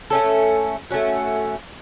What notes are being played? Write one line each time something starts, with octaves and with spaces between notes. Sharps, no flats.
A3 C#4 A4
A3 C#4 F#4